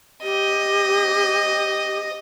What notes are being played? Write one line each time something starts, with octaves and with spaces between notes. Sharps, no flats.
G4 D#5